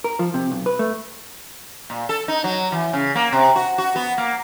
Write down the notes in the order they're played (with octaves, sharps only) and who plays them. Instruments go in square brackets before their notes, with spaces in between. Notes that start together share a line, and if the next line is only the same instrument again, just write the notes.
[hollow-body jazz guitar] A#4
F3
C3
B1
B4
A3
[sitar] A#2
A4
D#4
F#3
E3
C#3
A#3
C3
F#4
F#4
B3
A#3